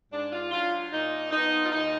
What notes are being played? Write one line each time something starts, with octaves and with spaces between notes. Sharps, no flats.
G#2 D4
F4
F#3 D4 F4
A#2 D#4
F3 B3 D#4
F4
D#2 D#4